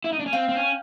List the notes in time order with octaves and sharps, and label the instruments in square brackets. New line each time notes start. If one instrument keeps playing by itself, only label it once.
[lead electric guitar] E4
D#4
D4
C#4
[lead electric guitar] C4 [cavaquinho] F5 G5
[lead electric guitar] C4
C#4